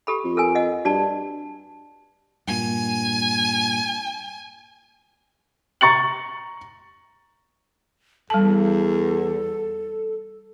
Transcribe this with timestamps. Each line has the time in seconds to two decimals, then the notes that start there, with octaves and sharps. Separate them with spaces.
0.07 G4 A4 B5
0.25 F2
0.37 A4 A#4 G#5
0.55 D#5 F#5
0.85 G2 F#4 D5 A5
2.47 G2 A#2 G#5
5.81 A#5 C#6 A6 C#7 F#7
8.30 E2 G3 A4 A5